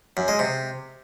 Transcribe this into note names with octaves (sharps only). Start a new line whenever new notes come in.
F#2
G#3
C3